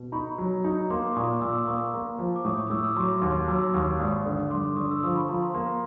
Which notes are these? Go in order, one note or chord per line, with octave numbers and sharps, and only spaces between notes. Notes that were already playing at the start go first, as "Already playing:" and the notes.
Already playing: B2
D#4 B5 C#6
F#3
D#4
A#3 C6 D6
D6
A#2 C#6 D#6
A#2 D6 E6
A#3 C#6 D#6
A#3
F3
D6
A2 C#6 D#6
C#6 D#6
A2 D6 E6
C#6 D#6
F#3 C6 D6
D#2
F#3 D6 E6
D#2 C#6 D#6
G#1 C#6 D#6
D3
G2 C6 D6
D3 C#6 D#6
E6
F3 C#6 D#6
B5 C#6
F3 A#5 C6
A#5 C6
A#3 A#5 C6